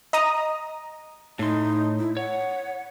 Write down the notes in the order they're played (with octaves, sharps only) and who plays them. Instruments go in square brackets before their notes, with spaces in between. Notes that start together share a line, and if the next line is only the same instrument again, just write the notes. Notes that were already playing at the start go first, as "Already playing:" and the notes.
[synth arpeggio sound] D#5 A#5 D#6
[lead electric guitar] A2 C6 [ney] D#4
[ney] E4
[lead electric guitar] C#5 [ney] F#5